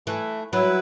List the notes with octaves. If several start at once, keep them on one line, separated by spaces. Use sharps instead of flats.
E3 A3
F#3 E4 B4